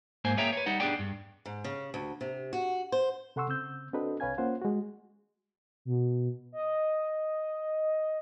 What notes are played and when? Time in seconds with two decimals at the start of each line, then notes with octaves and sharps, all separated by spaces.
0.24 G#2 A#3 C5 G#5
0.37 A#3 G#4 C#5 E5 G5 A#5
0.53 B4 C#5
0.66 G3 D#4 F#5
0.80 B3 D4 G4 G#4 D5 G5
0.99 G2
1.46 G#2
1.64 C#3
1.94 D2
2.21 C3
2.53 F#4
2.92 C5
3.36 C3 A4 F#5 C6 C#6 E6
3.48 C#3 C4 E6 G6
3.93 C4 D4 F#4 A4 B4 D#5
4.20 C2 B4 C#5 F5 G#5 G#6
4.38 A#3 C#4 F4 C5 F#5
4.61 G#3 F#4
5.85 B2
6.52 D#5